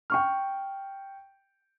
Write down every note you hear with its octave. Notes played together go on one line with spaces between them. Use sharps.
G5 C#6 F6